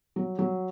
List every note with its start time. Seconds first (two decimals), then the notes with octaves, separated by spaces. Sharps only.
0.16 F#3
0.39 F#3